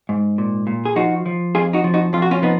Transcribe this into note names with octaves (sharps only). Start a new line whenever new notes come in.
G#2
A#2
A#2
G#4
F3 D#4 F#4
F3
F2 F4 G#4
D#4 F#4
F3
D#4 F#4
F2 F4
F#4
C#4 F4
F3 B3 D#4